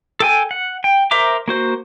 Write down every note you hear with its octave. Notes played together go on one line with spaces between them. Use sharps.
A4 G5 G#5
F#5
G5
A#4 C5 E5 A#5 D6
A#3 F#4 C5